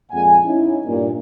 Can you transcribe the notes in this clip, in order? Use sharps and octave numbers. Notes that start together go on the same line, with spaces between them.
F2 A#2 G#3 F#5 G#5
C#4 D#4 E4
G2 A#2